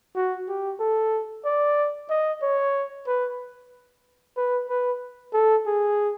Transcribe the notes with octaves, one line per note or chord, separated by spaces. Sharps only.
F#4
G4
A4
D5
D#5
C#5
B4
B4
B4
A4
G#4